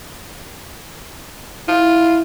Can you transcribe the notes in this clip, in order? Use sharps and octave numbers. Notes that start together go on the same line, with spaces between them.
E4 F4